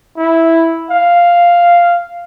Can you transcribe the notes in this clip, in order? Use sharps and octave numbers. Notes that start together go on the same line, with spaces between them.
E4
F5